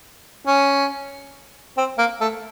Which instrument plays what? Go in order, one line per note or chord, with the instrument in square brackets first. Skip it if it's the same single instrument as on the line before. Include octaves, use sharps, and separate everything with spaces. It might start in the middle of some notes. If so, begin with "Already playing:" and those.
[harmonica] C#4
C4
A#3
A3